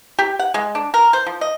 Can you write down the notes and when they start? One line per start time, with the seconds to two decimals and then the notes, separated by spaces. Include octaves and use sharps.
0.19 G4
0.39 F#5
0.54 G#3
0.75 D4
0.94 A#4
1.13 C5
1.26 F3
1.41 D#5